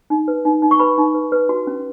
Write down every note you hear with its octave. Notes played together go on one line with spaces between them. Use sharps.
D#4
B4
D#4
D#4
C#6
B4 B5
D#4
B4
B4
F#4
C#4